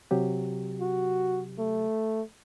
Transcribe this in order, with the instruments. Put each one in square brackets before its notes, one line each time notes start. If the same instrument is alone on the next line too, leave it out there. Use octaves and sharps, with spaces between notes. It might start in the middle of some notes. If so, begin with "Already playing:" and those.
[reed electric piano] C3 F#3 G4
[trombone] F#4
A3